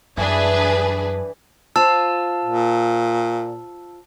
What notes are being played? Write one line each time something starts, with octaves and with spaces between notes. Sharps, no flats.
F#2 E3 G3 D4 G#4 B4
F4 C5 A5 E6
A#2